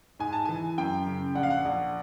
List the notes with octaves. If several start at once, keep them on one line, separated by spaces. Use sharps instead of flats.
G#2 G#5
A5
E3 G#5
F#2 G5
C#3
A#1 F#5
F5
F#5
A#1